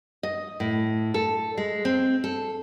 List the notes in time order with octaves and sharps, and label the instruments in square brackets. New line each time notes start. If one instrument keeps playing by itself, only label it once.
[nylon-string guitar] D#5
A2
A4
G#3
C4
A4